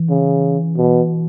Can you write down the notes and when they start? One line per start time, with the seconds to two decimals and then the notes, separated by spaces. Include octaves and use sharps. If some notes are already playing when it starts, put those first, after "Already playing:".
Already playing: E3
0.09 C#3
0.77 B2